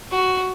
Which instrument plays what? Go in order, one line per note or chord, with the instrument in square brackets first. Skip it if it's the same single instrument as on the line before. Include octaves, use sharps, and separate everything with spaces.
[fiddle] F#4